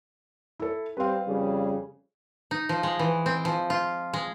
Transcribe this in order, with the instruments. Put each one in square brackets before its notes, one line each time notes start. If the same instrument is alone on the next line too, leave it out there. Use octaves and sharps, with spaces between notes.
[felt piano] E4 A4
[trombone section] G3 C4 [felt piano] B4 F5
[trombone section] F2 C#3 G3
[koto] D#4
F3
G#3
E3
C4
F3
F4
G#3